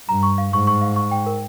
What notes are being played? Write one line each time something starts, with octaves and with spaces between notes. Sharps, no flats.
G2 A#5
C#6
F5
G#2 C#6
C#6
F5
C#6
G5
A#4